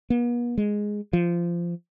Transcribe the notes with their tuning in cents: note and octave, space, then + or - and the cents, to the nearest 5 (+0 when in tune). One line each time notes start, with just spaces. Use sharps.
B3 -45
G#3 +0
F3 -20